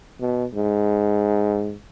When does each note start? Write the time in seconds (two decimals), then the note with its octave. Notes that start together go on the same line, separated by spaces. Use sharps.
0.21 B2
0.55 G#2